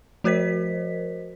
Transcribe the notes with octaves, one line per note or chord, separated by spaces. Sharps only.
F3 F#4 A#4 C5 D#5 B6